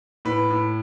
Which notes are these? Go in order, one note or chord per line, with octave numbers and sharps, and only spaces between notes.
A2 B4
A2